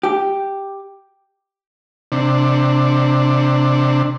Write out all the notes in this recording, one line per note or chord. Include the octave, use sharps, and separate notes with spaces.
G4
C3 D4